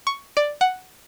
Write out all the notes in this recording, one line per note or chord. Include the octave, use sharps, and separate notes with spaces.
C#6
D5
F#5